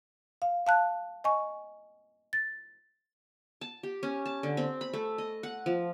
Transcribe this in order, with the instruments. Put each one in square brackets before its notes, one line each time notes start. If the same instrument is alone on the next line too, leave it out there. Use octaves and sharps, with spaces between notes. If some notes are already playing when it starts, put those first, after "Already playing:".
[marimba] F5
F5 A5 F#6
D#5 G#5 C#6
A6
[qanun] A5
G4
C#4
A5
D3
C4
B5
A3
D#5
F#5
F3